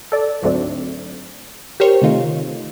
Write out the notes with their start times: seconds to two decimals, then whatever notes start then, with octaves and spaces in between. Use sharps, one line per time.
0.12 A4 D5
0.42 D2 G#2 F#3 A3 C4 D4
1.80 G4 A#4 C5 C#5
2.02 C3 D#3 A3 D#4 F4